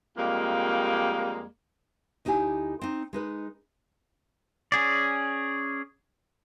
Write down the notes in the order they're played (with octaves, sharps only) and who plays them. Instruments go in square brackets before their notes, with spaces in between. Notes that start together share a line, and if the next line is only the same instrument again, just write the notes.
[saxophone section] F2 G3 G#3 A#3
[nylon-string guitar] D2 D#4 E4 G4 G#5
C4 D#4
G#3 D#4 B4
[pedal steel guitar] C#4 G#4 D5